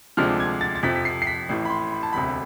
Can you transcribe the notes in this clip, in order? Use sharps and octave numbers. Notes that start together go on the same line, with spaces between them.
D2 C3 F3 G#3 D4 F6
G#6
A6
A6
F2 C3 F3 B6
B6
C7
C7
B6
A1 A2 E3
B5
C6
B5
A5
E1 D2 C3 B5